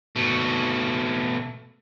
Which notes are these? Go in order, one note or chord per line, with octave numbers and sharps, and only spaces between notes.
B2 A3